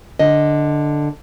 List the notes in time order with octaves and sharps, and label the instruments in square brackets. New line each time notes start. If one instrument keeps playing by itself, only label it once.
[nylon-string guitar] D3 D#5